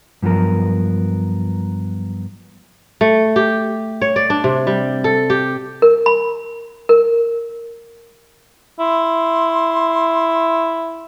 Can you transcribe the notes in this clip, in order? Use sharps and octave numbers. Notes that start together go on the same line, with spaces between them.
G2 F3 F#3 B3 A#4
A3
G4
C#5
D5
D4
C3
G3
A4
G4
A#4
B5
A#4
E4 C6